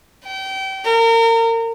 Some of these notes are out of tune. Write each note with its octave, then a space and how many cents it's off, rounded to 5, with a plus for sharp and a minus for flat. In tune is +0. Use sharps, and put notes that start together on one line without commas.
G5 -30
A#4 -30